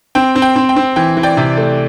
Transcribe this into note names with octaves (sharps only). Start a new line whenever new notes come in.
C4 G5
C4
G5
C4
G5
C4
E3 G5
E3
D5 G5
C3
A3